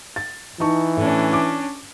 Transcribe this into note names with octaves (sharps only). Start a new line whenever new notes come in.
A6
E3 D#4 A5 C#6
A2 C#4 D4
D6